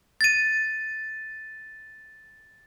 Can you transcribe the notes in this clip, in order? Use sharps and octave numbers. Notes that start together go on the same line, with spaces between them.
A6 D#7